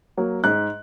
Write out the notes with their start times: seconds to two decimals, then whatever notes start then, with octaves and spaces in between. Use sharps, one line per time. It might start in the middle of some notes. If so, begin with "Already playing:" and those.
0.17 F#3 A#3
0.44 G#2 F#6